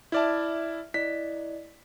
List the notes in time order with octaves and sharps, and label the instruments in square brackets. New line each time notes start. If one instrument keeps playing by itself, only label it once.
[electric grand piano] E4 D5 A5 [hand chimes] E5 F6 G#6
[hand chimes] E4 D5 D#5 [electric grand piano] B6